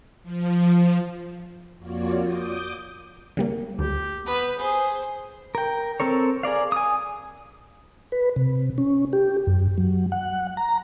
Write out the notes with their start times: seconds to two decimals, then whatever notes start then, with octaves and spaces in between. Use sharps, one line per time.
0.23 F3
1.77 F2 A#3 F4 F#4 C#5 D5
2.21 D6 D#6 G6
3.37 C#3 G3 A#3
3.79 D2 G4
4.26 B3 B4
4.59 G#4 C5
5.55 A#4 G5
6.00 C4 A4 A#4 C#5
6.43 G#4 A#4 D5 F5
6.72 G#5 D#6
8.12 B4
8.36 C3
8.78 C#4
9.13 G4
9.47 F#2
9.78 F#3
10.12 F#5
10.57 A#5